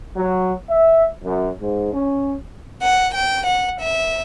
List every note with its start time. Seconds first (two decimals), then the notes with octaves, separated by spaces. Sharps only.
0.17 F#3
0.69 E5
1.23 F#2
1.61 G#2
1.93 C#4
2.82 F#5
3.14 G5
3.46 F#5
3.80 E5